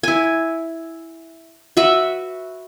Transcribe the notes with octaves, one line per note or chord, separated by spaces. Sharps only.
E4 G#5
F#4 B4 E5